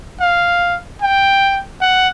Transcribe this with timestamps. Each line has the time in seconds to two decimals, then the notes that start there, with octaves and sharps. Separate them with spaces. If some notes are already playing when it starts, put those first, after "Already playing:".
0.21 F5
1.02 G5
1.81 F#5